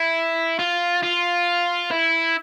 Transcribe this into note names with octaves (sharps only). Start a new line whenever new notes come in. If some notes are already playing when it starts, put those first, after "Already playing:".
Already playing: E4
F4
F4
E4